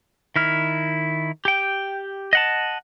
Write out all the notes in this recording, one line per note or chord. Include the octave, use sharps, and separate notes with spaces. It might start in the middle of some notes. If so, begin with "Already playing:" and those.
D#3 E4 F6
G4 G5
D#5 F#5 A5